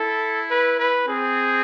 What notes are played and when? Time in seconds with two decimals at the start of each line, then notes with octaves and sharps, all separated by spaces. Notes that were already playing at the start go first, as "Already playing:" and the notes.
Already playing: E4 A4
0.50 B4
0.79 B4
1.07 C4 G#4